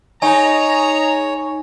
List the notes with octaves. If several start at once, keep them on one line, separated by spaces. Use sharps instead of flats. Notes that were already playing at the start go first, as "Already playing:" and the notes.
D#4 G#4 C#5 D#5 G#5 A#5